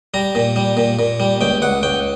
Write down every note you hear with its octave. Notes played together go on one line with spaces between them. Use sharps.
G3 A#5
A#2
G3
A#2
A#2
G3
C#2 G5
C#2 F#5
C#2 G5